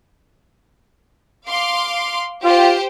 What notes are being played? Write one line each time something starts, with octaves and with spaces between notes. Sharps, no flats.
F5 C6 D6
F4 G4 C5 G5